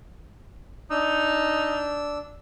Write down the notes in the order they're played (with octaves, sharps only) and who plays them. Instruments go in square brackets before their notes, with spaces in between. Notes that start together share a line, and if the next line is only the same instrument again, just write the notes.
[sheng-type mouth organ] D4 E6 [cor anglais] D#4